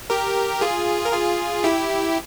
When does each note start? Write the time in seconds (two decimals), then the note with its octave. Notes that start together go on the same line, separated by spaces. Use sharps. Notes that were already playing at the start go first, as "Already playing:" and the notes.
0.10 G4 A#4
0.61 F4 G#4
1.05 A#4
1.13 F4 G#4
1.64 E4 G4